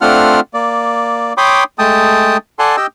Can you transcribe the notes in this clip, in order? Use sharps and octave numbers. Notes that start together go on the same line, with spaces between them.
A3 C4 D4 F4 F#5 F6
A#3 D5
C#5 G5 B5 C6 D6 D#6
G#3 A3 G5 A5 D#6
A4 D5 F#5 G#5 A5 C6
G4 D#5 G5 E6